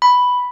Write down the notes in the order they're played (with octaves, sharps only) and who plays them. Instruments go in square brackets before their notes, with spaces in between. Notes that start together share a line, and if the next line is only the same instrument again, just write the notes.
[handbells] B5